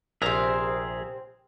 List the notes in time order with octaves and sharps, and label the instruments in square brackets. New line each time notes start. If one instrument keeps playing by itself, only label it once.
[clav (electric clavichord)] A#1 A#5 [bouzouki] C3 C4 C5 [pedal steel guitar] G#4 A#4 E5